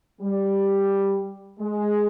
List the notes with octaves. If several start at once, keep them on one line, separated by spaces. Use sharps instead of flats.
G3
G#3